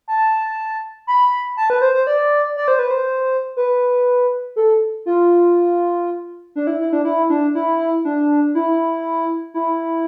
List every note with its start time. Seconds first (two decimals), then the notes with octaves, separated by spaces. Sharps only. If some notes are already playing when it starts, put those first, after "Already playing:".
0.08 A5
1.07 B5
1.57 A5
1.70 B4
1.82 C5
1.94 C5
2.07 D5
2.57 D5
2.68 C5
2.79 B4
2.91 C5
3.57 B4
4.56 A4
5.06 F4
6.56 D4
6.67 E4
6.80 E4
6.93 D4
7.05 E4
7.30 D4
7.55 E4
8.05 D4
8.55 E4
9.54 E4